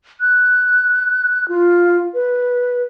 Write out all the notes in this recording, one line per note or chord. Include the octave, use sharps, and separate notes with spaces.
F#6
F4
B4